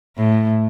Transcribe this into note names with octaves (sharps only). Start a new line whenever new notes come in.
A2